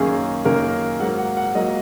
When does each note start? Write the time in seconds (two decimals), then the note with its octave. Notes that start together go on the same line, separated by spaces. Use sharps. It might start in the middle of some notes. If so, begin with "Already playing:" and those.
Already playing: F#2 D#3 A#3 C#4 G#4
0.45 F#2 D#3 A#3 C#4 A#4
1.00 G#2 F#3 A#3 F#5
1.18 F#5
1.37 F#5
1.55 G#2 F#3 A#3 D#5